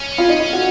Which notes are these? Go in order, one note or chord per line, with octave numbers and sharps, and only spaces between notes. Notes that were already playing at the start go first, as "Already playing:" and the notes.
Already playing: C#4
F4
D#4
F4
F#4